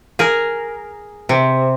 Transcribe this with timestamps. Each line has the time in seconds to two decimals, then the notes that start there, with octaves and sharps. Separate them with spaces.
0.19 G#4 A#4
1.29 C3